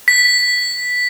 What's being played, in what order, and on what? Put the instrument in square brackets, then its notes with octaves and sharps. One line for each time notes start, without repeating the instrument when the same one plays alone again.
[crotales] B6